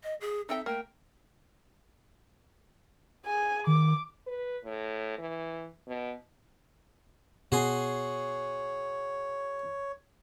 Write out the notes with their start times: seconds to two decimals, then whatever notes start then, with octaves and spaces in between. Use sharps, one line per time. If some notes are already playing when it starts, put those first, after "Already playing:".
0.04 D#5
0.21 G#4
0.49 C4 D#4 A4 E5 G5
0.66 A3 A#3 G5
3.25 G#4 G#5
3.67 D#3 D6
4.27 B4
4.64 A2
5.18 E3
5.87 B2
7.52 B2 F#4 G#4 C#5 C6